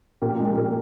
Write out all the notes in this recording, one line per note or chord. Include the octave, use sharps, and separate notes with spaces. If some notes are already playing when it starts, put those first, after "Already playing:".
A#2 G4 A#4
G#3
A#2 G4 A#4